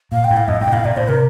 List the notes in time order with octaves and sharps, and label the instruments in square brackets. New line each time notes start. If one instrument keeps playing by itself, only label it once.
[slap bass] A#2 [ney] F5
[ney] G5
[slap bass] A2
[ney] F5
[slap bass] F2 [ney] D#5
[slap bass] G2 [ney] G5
[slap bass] A#2
[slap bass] A2 [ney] F5
[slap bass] A#2 [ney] D5
[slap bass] A2 [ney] C5
[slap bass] C3 [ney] A#4